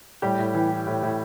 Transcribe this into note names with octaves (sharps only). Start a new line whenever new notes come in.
A2 G3 G4
A2
E3
E3
A2
A2